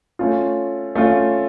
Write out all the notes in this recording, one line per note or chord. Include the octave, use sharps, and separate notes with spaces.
A3 C#4 F4
A3 C#4 F4